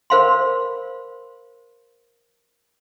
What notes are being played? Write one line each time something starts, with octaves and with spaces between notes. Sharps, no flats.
A#4 C5 F5 B5 C6